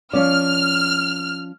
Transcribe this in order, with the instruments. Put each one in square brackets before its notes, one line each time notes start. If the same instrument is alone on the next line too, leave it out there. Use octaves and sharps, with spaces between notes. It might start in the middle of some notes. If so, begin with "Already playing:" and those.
[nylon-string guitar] F3 C#4 D5 [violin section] F6